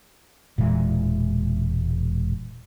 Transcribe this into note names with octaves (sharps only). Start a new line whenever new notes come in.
E1 A#2 E3 G#3